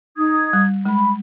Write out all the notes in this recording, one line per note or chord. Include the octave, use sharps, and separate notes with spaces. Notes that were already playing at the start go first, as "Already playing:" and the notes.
D#4 D#6 G#6
G3
G#3 B5